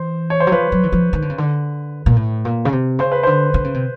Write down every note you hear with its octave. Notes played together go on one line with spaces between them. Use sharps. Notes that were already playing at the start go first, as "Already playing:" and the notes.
Already playing: E3 C5
C#5
C5
F#3
F3 B4
F#3
E3
F3
D#3
D3
C#3
D3
A#2
A2
A#2
C#3
C3
C#3 C5
B4
D3 C5
D3
C#3
C3